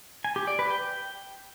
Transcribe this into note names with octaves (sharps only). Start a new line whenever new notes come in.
G#5
G4
D5
B4
G5